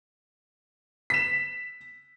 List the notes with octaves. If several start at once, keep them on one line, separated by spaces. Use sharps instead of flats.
B6 E7